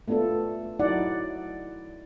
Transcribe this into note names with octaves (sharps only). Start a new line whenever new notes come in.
A3 B3 D4 F4 A4
F#3 D#4 E4 D5 F#5